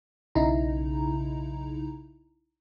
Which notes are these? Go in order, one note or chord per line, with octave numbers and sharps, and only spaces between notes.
B1 C#3 D#4 E4 A#5